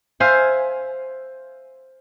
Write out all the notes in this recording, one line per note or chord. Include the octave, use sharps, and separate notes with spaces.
C5 E5 F5 G#5